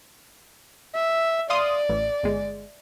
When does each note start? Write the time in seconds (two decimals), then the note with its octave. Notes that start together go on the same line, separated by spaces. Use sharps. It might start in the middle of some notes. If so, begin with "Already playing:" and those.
0.95 E5
1.50 D5 F5 C6 D#6
1.89 A1
2.23 G1 G#3